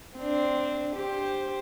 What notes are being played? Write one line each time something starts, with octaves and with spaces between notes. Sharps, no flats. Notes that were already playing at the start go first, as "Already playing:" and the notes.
C4 D4
G4 C5